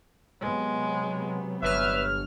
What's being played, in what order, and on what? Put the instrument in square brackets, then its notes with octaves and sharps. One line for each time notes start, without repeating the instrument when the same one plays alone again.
[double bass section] C3 F#3 B3 [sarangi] G#3
[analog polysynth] G1 F6 [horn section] B4 E5 [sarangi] C#5